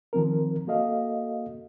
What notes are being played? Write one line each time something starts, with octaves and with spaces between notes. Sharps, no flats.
D#3 F3 C4 A#4
A#3 F#4 A4 D#5 F5